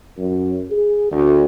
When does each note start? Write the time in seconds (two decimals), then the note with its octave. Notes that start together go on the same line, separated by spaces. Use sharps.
0.18 F#2
0.71 G#4
1.11 D2